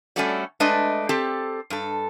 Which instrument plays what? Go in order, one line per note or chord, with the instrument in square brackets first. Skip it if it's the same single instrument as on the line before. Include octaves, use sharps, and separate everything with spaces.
[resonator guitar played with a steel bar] G3 A3 C#4 F#4 A4 D5
G#3 A3 D4 B4 D#5
C4 G4 A4
G2 A4